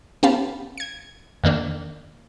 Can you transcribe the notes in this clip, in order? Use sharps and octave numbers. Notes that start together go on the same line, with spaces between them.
B3 C#4 G4 F5 A5 B5
G#6 C#7
F2 D#3 A#3 D4